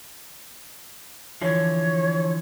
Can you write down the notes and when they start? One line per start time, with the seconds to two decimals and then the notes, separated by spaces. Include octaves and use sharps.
1.42 D3 E3 F3 C#5